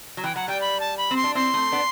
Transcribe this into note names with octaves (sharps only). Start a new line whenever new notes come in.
F#3
E3 G5
F#3 F#5
G3 G5
B5
A5
B5
C4
C6
D4
C4 E4 C6
A3 C4
B3 D4